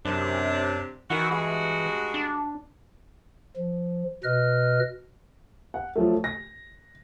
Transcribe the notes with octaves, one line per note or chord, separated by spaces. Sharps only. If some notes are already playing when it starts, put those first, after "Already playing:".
F#2 C3 D4
D#3 E3 F#4
G2 G#3 F#4
D4
F3
B2 B4 D#5 F6
F#5
F3 F#3 A3
A#6